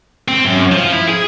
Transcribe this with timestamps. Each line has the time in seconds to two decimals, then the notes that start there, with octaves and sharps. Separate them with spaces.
0.28 C4
0.45 F#2
0.72 F3
0.92 E4
1.09 G#4